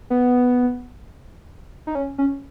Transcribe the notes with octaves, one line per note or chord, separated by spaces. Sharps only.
B3
D#4
C#4
C#4